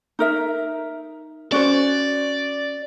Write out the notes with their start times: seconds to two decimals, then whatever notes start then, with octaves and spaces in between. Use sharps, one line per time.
0.19 D#4 A#4 E5
1.52 C#4 F#4 C5 D5